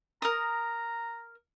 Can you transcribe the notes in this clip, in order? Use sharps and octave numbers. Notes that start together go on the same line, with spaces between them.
A#4 A#5 D#6